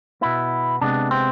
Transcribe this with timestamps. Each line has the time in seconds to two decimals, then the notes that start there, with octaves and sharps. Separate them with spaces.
0.21 B2 B3 E4
0.81 C3 G#3 B3 D4
1.11 C4